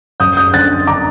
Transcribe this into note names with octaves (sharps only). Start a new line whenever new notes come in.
F#2 D#6 G6
D#6 G6
D3 F#6 A6
D3 A#5 D6